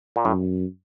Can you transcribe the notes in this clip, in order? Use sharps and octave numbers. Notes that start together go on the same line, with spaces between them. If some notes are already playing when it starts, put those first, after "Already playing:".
A#2
F#2 A2